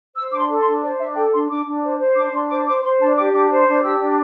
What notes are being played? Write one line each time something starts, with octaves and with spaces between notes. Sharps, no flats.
C5 E6
D4 D6
C6
A4
C6
D4
C5 D5
D4 E5
A4 G5
D4 C6
D4 D6
D4
C5
C5
D4 D6
D4 C6
C5 D6
C5 D6
C5 C6
D4 A5
G4 D6
D4 D6
C5
D4
G4 E6
D4